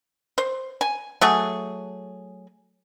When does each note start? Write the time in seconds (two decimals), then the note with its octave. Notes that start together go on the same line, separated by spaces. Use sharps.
0.38 C5
0.81 G#5
1.21 F#3 A3 G#4